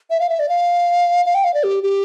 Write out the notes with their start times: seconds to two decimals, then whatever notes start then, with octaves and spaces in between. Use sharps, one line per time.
0.10 E5
0.20 F5
0.29 E5
0.39 D5
0.49 F5
1.25 F5
1.35 G5
1.44 F5
1.54 D5
1.64 G4
1.83 G4